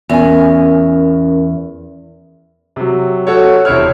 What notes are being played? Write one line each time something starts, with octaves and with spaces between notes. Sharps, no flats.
E2 C#4 A#4 G#5
C3 F#3
F#4 A4 C#5
E1 C3 C4 E4 C#5 F6